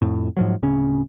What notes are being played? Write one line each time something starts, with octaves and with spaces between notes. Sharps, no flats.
F2 A2
G#2 F3 F#3
D1 C#3 C#4